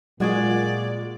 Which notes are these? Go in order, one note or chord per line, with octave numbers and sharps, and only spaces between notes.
A#2 F#3 G#3 F#4 G#4 D5 F#5 G#6